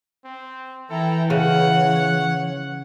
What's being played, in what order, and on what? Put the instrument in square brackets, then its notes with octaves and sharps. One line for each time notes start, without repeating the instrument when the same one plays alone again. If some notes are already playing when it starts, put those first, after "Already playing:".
[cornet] C4
[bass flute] E3 [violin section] E4 G5 A#5 [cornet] A4
[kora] C#3 [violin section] C#5 [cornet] F#5